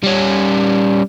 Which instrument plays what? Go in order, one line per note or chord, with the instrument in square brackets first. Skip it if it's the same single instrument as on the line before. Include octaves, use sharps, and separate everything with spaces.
[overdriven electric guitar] G3 C#4